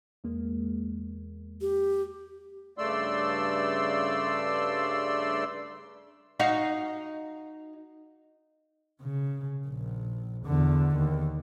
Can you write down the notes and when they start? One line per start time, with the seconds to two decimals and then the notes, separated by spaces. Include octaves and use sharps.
0.24 E2 G#3 A#3
1.61 G4
2.78 G2 C#3 A3 D5 C6 E6
6.40 D#4 F#4 F5
9.02 C#3
9.67 A#1
10.46 E2 D3
10.96 D#2